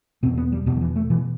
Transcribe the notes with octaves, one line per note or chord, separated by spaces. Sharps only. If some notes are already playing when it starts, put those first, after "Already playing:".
E2 B2 C4
B3
G3
E2 B2 G3
D#3
E3
A3
B2 E3